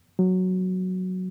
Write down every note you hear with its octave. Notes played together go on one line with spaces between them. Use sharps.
F#3